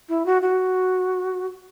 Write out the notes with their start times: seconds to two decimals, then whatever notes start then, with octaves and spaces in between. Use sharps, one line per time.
0.09 E4
0.26 F#4
0.42 F#4